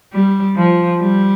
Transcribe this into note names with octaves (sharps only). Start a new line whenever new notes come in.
G3
F3
G3